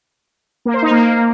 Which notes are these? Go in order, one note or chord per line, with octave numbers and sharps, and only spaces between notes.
A#3
C5
D#4
A#3